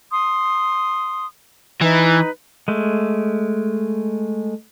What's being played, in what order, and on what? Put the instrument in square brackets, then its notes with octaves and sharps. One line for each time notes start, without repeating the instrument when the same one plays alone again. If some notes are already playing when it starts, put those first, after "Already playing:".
[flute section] C6 D#6
[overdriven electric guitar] E3 [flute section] D#4 B4
[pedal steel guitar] G#3 A3